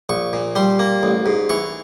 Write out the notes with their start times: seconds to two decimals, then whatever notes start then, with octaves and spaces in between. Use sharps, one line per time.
0.09 A#1 C#6
0.33 A#2
0.56 G3 C6
0.79 A#3
1.03 A1
1.26 G#2
1.49 E3 C#6